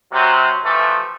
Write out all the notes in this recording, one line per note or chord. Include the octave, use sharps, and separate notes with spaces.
C3 F#3
E3 F3 G3 A3